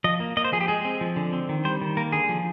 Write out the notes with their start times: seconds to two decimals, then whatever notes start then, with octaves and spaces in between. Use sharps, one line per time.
0.04 F3 D#5
0.20 A#3
0.37 A#3 D#5
0.44 C5
0.52 F3 G#4
0.61 G4
0.68 G#3 G#4
0.85 C4
1.01 F3
1.16 D3
1.33 C4
1.49 D#3
1.65 G3 C5
1.82 D#3
1.97 A#3 A#4
2.12 D3 G#4
2.29 F3